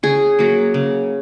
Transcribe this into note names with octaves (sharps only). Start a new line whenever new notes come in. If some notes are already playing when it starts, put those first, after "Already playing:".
C#3 G#4
F#3 A#3
C#3